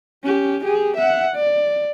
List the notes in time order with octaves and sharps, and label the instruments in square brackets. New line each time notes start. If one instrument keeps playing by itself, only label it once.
[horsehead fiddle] C#4 G4
G4 G#4
E5 F#5
D5